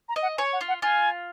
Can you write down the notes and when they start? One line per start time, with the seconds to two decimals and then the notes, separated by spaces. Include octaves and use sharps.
0.09 A#5
0.16 D#5
0.22 F#5
0.37 C#5 G#5
0.53 F#5
0.61 F4
0.68 F#5
0.82 F4 G#5